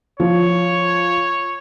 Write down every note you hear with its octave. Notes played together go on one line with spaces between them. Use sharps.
F3 C#5